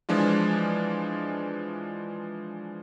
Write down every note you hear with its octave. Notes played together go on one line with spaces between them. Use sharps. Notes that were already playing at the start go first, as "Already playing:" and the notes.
E3 F3 G#3 D4 F4